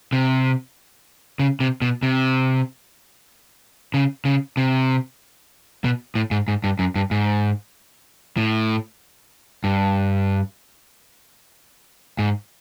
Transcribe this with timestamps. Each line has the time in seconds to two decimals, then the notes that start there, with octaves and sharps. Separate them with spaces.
0.13 C3
1.39 C#3
1.60 C3
1.82 B2
2.03 C3
3.94 C#3
4.25 C#3
4.57 C3
5.84 B2
6.15 A2
6.31 G#2
6.48 G#2
6.64 G2
6.79 F#2
6.95 G2
7.11 G#2
8.37 A2
9.64 G2
12.19 G#2